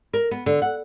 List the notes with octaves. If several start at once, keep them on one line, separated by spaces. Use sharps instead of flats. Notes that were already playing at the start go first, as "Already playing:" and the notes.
A#4
B3
D3
F#5